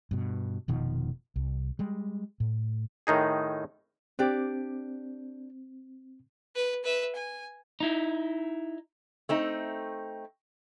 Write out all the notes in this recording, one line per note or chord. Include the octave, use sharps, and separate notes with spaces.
G2 B2
F1 B2 D#3 F3
C2
G3 G#3
A2
A2 D#3 D#4 G#4
C4 D4 G4 D5
B4
B4 E5
G#5
D#4 E4
A3 C4 D#4